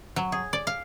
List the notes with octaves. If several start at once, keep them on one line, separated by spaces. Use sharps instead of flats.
F#3
G#4
D5
F5